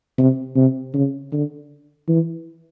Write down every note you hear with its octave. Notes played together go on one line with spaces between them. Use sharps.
C3
C3
C#3
D3
E3